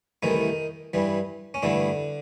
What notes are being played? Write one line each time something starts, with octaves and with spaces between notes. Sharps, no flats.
C2 C3 D#3 E3 A3 D#4
G2 E3 G3
C#4
G2 D3 E3 A3 D4